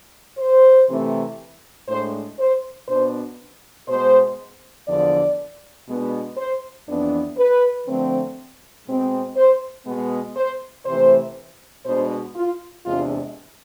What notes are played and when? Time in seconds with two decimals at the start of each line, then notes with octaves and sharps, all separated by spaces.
0.38 C5
0.89 C3 E3 A3 C4
1.88 A2 G#3 D4 C5
2.38 C5
2.88 B2 B3 D4 C5
3.87 B2 G#3 B3 C5
4.87 E2 D3 F3 D5
5.87 B2 G#3 B3 D4
6.37 C5
6.87 F2 E3 B3 D4
7.37 B4
7.86 D3 F3 A3 C4
8.86 B2 G#3 C4
9.36 C5
9.86 B2 G#3 B3
10.36 C5
10.85 C3 E3 A3 C5
11.85 B2 G#3 B3 D4 C5
12.35 F4
12.85 E2 C3 G#3 D4 F4